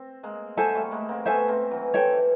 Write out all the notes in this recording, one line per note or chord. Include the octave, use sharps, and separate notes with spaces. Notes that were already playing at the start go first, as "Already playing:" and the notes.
Already playing: C4
G#3 A#3
F#3 G#3 A4 C5 E5 G#5
G3 A3
G#3 A#3
A#3 C4
A3 B3 A4 C5 E5 G#5
A#3 C4
E3 F#3
F3 A4 C#5 E5 G5
E3